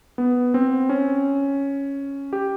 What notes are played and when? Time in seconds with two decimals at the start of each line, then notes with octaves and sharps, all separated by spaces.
0.18 B3
0.54 C4
0.89 C#4
2.33 G4